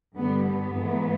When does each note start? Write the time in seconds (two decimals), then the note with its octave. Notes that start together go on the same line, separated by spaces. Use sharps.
0.16 G2 D3 G3 B3
0.45 B3
0.74 G#2 E3 A3